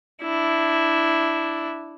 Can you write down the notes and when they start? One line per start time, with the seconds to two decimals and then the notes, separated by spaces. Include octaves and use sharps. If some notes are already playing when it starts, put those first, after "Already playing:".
0.22 D4 E4